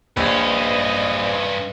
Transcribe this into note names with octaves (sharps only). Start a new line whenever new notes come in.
A#1 G2 C#4 B4 D#5